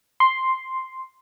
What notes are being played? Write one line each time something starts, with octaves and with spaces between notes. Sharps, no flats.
C6